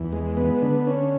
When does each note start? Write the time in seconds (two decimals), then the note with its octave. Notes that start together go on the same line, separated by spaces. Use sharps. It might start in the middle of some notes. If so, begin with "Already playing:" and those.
Already playing: E2
0.13 G#3
0.37 B3
0.62 D3
0.87 C#4